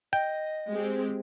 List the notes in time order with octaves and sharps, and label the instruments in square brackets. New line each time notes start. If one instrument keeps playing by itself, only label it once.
[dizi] D#5 [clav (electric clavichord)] G5
[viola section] G#3 C4 G4